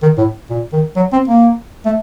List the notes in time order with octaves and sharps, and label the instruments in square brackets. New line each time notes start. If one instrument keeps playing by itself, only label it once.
[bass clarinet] D#3
A2
A#2
D#3
F#3
C4
A#3
A3